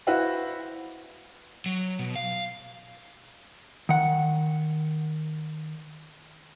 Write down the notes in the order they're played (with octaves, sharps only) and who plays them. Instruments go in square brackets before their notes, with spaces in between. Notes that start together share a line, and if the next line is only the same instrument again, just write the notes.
[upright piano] E4 F#4 B4 C5 F5 F#5
[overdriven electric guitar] F#3
B2
F5
[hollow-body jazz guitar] D#3 F#5